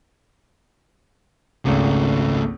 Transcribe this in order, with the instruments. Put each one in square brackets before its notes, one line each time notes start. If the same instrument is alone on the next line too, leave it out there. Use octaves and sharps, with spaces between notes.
[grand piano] G#1 C#2 [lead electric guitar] C#3 A3